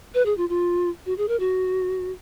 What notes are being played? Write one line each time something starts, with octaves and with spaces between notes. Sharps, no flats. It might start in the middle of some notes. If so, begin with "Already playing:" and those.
B4
G#4
F4
F4
F#4
G#4
A#4
F#4